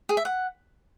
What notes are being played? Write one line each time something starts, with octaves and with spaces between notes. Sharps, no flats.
G#4
E5
F#5